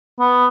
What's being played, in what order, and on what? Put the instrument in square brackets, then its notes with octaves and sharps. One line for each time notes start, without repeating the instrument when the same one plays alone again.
[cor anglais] B3